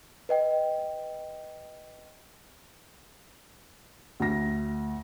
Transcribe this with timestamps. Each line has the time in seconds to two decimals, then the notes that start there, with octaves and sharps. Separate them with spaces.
0.29 B4 D#5 G5
4.20 D2 A#6